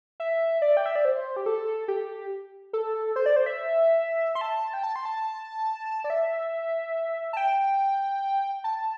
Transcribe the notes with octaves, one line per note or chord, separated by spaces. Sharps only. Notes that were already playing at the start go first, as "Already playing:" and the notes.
E5
D5
G5
E5
D5
C5
G4
A4
G4
A4
C5
D5
C5
E5
C6
A5
G5
A5
C6
A5
D5
E5
A5
G5
A5